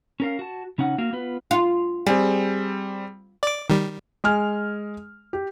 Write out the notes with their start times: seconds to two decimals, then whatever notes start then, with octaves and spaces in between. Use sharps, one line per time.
0.20 C#4 A#4 F5
0.39 F#4 A5
0.78 C#3 C#4 D#4 F#5
0.98 A#3 F#4 F5
1.13 B3 F4 B4
1.51 F4
2.07 G3 C4 G#4
3.43 D5 D6
3.70 D#3 G3
4.24 G#3 G#5 F6
5.33 G4